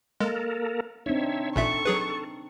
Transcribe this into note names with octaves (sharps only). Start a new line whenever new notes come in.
G#3 A#3 A4 A#4
C4 D4 D#4 C#5 E5
A1 A#2 A4 E5 C#6
F#3 G#4 B4